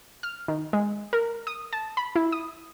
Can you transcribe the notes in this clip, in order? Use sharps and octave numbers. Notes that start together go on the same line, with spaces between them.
F6
D#3
G#3
A#4
D#6
A5
B5
E4
D#6